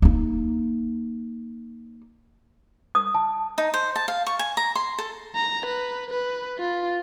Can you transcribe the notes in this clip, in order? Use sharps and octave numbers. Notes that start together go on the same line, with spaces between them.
A#3 D#4
D#6
A5
D#4
C5
A5
F5
C#6
G#5
A#5
C6
A4
A#5
B4
B4
F4